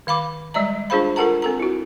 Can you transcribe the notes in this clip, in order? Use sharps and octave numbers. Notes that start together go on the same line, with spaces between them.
D#3 F5 B5 D6
G3 G#3 D5 E5 A#5
D4 F4 G#4 C5 F5 B5
F4 A4 A#4 F#5 A5 A#5
C4 A4 A#5
E4 F#4